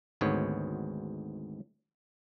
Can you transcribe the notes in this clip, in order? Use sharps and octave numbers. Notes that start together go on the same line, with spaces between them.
G#1 D2 G#2 B3 C#5